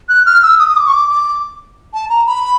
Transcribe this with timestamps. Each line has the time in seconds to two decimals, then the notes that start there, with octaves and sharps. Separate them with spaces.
0.09 F#6
0.26 F6
0.42 E6
0.59 D#6
0.69 D#6
0.76 D6
0.87 C#6
0.92 D6
1.09 D6
1.93 A5
2.09 A#5
2.26 B5